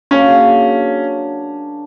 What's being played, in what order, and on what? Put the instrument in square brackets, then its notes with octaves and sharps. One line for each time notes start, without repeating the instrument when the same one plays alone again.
[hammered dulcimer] C#3 F#3 A#3 D4 [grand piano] C#4